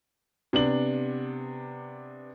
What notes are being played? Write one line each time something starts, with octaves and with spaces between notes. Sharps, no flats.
C3 B3 D4 F#7